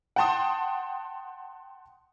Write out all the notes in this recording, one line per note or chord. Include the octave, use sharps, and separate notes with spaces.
F#5 G5 A5 C6 D#6